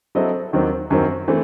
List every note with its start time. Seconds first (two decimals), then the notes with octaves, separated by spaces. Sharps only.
0.15 F#3 C4 E4 A4 D#5
0.53 D#2 D#3 F#3 C4
0.90 F#2 D#3 F#3 C4
1.28 E3 A3 C4